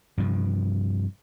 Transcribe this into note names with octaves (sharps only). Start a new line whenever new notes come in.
G2 C3 F3